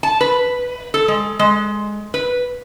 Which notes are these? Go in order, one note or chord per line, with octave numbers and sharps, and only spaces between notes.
A5
B4
A4
G#3
G#3
B4